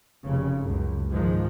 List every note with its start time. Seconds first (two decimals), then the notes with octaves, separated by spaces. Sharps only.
0.24 F1 C#3
0.59 C#2 F#2
1.11 G#2 D#3 F3 G#3